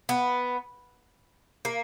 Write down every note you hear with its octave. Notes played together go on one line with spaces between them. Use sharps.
B3
A#3